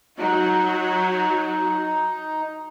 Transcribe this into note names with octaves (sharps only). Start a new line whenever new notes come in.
F#3 D#4 F#4